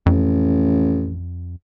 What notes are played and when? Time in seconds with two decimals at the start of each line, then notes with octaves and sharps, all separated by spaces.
0.06 A1 F2